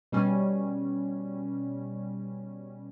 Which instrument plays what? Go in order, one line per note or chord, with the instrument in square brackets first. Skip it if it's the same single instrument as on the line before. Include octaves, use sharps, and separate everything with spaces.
[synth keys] B2 G3 C#4